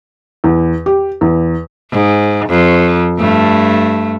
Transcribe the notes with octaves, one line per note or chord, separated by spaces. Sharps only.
E2
G4
E2
G#2
F2
G2 A3